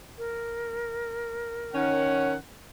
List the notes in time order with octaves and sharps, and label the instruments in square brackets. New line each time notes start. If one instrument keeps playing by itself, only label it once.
[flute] A#4
[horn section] D#3 C#4 F#5